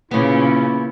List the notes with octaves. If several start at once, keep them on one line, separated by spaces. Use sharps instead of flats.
A#2 C#3 B3 C#4 E4